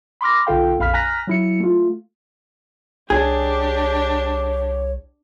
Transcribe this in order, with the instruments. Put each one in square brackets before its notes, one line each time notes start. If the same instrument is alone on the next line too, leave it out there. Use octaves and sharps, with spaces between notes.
[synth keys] B5 C6 D6 F6 A#6
B1 D3 F4 A4 F5 G5
A#1 F2 F5 B5 F6 B6
G#5 A#5 F6 F#6 A#6 B6
F#3 E4 C#7
A3 F4
[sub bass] C2 [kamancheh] D4 G4 [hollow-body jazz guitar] G#4 [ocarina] C#5